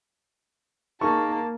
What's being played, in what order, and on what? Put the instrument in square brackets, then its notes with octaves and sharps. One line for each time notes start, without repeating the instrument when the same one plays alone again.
[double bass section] A#3 [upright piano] D#4 G#4 [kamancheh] A5 [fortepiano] C#6